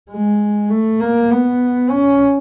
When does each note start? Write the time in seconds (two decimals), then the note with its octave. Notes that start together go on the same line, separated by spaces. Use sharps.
0.10 G#3
0.70 A3
1.00 A#3
1.31 B3
1.90 C#4